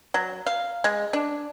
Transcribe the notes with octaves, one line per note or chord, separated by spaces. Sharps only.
F#3
F5
G#3
D4